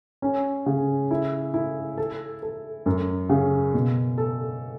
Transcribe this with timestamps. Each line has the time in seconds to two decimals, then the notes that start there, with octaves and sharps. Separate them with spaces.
0.22 C#4
0.66 C#3
1.11 E4
1.54 E4
1.98 A4
2.43 A4
2.86 F#2
3.29 C#3
3.74 B2
4.18 A4